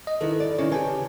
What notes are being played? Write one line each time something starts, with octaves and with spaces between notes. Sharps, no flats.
D#5
D#3 E4 A4 B4
D5
D#3 C#4 E4 C#5
C#3 G4 B4 G#5 A5